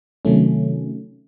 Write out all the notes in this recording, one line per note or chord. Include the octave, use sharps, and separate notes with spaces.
C3 D#3 F#3 A3 C#4